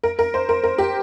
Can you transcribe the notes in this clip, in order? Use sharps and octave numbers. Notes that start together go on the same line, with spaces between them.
A#4
A#4
C5
A#4
A#4
G4